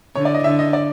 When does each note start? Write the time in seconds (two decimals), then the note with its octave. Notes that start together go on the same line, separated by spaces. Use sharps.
0.15 D3 C#5
0.25 D5
0.34 D#5
0.44 D3 E5
0.59 D#5
0.73 D5